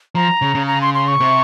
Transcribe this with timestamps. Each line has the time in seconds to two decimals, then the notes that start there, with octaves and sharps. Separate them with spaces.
0.15 F3 A#5
0.42 C#3
0.55 C#3
0.67 A#5
0.82 C6
0.94 C6
1.08 C#6
1.20 C3